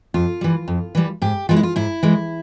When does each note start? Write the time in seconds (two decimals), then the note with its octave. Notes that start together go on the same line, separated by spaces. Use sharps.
0.14 F2 F4
0.41 E3 G3
0.68 F2
0.95 E3 G3
1.22 G#2 G4
1.49 E3 G#3 F4
1.56 E4
1.63 F4
1.76 G#2 E4
2.03 E3 G#3